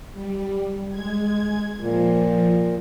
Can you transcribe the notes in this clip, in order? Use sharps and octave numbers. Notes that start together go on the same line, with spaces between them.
G3
G#3 G#6
A#2 F3